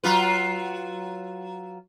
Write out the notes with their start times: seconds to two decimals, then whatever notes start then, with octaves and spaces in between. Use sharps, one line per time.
0.04 F#3 F4 B4